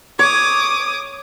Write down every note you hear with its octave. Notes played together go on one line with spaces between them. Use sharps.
C#5 D6 D#6